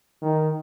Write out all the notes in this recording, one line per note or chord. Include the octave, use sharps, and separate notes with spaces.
D#3